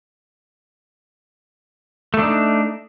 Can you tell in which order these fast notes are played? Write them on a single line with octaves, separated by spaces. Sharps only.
A3 D4 D#4